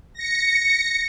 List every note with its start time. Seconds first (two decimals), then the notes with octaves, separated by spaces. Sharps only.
0.14 A#6 C#7